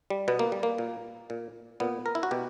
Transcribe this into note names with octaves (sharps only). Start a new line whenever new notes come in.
G3
B2 B3
A#3
G3
A#3
A#2
A#2
A#2 B3
A#4
E4
F#4
B2 G4